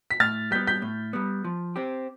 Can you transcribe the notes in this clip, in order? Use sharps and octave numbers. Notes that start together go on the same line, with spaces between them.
B6
A2 F6 A6
G3 B3 G6 B6
G6 B6
A2
G3 B3
F3
C4 G4